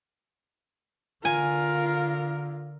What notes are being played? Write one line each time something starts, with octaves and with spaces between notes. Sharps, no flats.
D3 F4 A#4 G#5